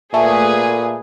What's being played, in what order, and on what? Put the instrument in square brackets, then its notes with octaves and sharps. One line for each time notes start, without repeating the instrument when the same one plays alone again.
[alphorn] A#2 [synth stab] A3 [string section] G#4 B4